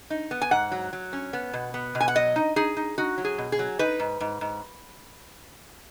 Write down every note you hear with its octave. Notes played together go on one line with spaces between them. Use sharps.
D#4
B3
G#5
G#2 F#5
F#3
F#3
C#4
B3
B2
B3
B2
G#5
F#5
F#3 D#5
D#4
D#4 G#4
D#4
D#4 F#4
F#3
G#4
B2
G#4
F#3
D#4 B4
G#2
G#2
G#2